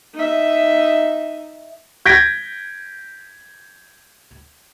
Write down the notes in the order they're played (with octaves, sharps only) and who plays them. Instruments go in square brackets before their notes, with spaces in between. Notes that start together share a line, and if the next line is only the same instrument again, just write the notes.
[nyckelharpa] D#4 E5
[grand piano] G6 G#6 A#6 B6 D7